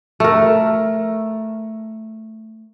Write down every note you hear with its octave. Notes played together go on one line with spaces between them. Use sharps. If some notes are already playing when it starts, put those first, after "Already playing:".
A3 A#4